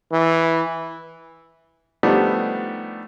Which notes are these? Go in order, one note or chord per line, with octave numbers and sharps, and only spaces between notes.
E3
F3 G3 A3 B3 D4 D#4